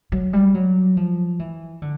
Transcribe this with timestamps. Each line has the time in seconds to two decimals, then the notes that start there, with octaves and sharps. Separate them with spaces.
0.12 F#3
0.33 G3
0.54 F#3
0.97 F3
1.39 E3
1.82 D3